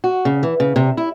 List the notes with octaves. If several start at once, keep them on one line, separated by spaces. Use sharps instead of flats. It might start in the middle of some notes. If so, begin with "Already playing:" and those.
F#4
C#3
E3
C#3
C3
E4